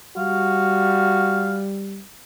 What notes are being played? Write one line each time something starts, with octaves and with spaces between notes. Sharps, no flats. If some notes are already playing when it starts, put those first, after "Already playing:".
G3 F#4 F5